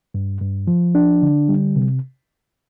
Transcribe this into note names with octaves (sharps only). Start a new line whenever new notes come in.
G2
G2
F3
D4
D3
G3
C3